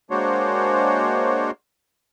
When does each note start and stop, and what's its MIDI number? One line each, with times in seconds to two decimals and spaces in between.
0.11 1.51 56
0.11 1.51 58
0.11 1.51 62
0.11 1.51 66
0.11 1.51 72
0.11 1.51 73